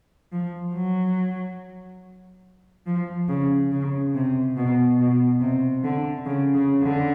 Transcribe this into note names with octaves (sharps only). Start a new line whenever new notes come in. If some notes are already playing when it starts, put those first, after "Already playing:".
F3
F#3
F3
C#3
C#3
C3
B2
B2
C3
D3
C#3
C#3
D3